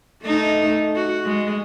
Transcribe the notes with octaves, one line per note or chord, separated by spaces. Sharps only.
A3 D#4
F#4
G#3